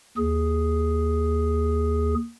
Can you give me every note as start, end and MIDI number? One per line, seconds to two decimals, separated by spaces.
0.17 2.15 39
0.17 2.15 68